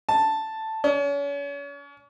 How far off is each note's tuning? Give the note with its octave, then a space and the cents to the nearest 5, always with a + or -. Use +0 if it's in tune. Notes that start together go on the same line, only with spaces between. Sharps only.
A5 +5
C#4 +40